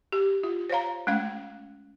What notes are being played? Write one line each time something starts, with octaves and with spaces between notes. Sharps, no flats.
G4
F4
C5 C#5 F5 A#5
G#3 A3 C#4 F5